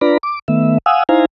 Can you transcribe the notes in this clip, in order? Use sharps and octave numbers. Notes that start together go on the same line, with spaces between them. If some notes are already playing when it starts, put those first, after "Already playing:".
D4 F4 B4 D5 A#5 B5
D6
D#3 A3 B3 E5
F5 F#5 G#5 D#6 E6
D#4 E4 C5 F5 G#5 A#5